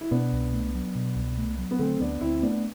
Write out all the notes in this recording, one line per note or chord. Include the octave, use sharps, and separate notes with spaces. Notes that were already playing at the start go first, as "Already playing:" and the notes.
E4
B2 B3 D4
C2
A3
F#3
B2
C2
A3
F#3
B3
D3 A3 C4
D2 B3 D4
D2 C4 E4
C4
A3 B3 D4